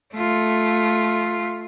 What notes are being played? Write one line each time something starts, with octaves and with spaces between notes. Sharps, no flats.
A3 F4